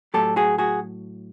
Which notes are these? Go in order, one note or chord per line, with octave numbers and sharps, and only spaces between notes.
A2 F#3 G4 A4
F#4 G#4
F#4 G#4